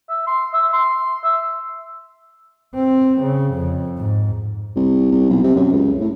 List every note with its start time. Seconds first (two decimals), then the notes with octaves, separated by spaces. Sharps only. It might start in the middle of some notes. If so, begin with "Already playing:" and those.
0.09 E5
0.27 C6
0.53 E5
0.73 C6
1.23 E5
2.75 C4
3.22 C#3
3.55 F2
3.98 G#2
4.76 C2
5.12 C2
5.30 B1
5.44 C3
5.56 F#2
5.73 C#2
6.01 A2